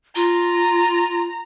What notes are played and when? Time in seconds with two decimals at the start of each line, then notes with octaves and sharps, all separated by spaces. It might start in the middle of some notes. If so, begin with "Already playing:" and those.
0.16 F4 A#5